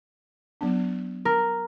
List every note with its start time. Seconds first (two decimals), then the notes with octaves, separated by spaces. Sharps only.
0.61 F#3 B3 D4
1.25 A#4